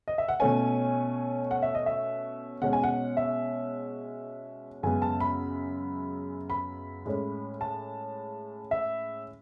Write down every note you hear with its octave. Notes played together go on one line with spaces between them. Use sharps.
D#5
E5
F#5
B2 A3 C#4 G#5
F#5
E5
D#5
E5
B2 G#3 C#4 F#5
G#5
F#5
E5
F#2 C#3 G#3 B3 G#5
A5
B5
B5
A2 G#3 C#4
A5
E5